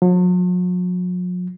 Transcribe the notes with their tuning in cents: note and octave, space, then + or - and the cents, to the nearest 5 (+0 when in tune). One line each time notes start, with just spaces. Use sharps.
F#3 -45